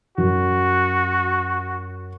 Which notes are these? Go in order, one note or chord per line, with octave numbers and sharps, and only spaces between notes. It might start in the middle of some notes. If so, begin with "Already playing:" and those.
F#2 F#4